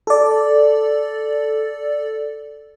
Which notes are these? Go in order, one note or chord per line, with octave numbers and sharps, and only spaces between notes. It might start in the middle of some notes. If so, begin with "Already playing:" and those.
A4 D5